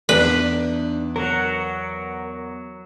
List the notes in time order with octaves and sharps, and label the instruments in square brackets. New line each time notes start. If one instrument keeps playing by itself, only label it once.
[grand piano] E2 [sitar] D4 D#4 D5 [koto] B4
[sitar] F#3 [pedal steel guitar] A#4 F#5